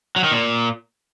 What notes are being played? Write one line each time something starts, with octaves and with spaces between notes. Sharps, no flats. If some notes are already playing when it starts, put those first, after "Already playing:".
F#3
D#3
A#2